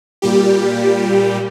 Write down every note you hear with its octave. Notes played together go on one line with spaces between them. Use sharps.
A#2 G3 G4